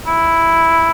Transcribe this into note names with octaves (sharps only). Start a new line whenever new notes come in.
E4